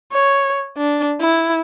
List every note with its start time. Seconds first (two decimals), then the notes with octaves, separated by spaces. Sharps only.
0.12 C#5
0.77 D4
1.21 E4